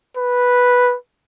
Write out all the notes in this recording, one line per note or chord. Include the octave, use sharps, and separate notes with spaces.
B4